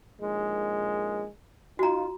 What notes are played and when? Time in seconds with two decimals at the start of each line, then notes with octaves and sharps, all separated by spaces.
0.20 A#1 D#2 G#3
1.79 D#4 F4 F#4 A#5